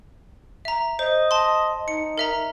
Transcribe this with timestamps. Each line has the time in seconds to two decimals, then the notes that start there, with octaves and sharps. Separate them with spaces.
0.65 E5 A#5
0.99 C5 D#5
1.31 A5 C6
1.88 D#4 C#7
2.18 A#4 E5 A#5